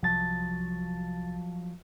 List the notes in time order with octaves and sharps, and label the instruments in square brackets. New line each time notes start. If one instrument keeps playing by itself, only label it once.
[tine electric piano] C2 A6 [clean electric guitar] F3 F#3 A5